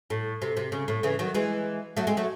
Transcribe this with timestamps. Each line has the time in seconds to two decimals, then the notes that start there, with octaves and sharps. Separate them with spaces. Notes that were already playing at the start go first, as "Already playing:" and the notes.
0.10 A2
0.42 C3
0.57 C3
0.72 C#3
0.88 A2
1.03 C#3 E3
1.19 D#3 F#3
1.34 E3 G#3
1.97 F#3 A3
2.07 G#3 C4
2.17 F#3 A3